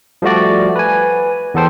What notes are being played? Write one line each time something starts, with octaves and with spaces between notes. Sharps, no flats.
F3 G3 A3 F#4 D5
B4 G#5
E2 B3 A4 C5 G5